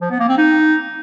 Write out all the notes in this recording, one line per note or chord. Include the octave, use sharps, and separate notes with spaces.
F3
B3
A#3
C4
D#4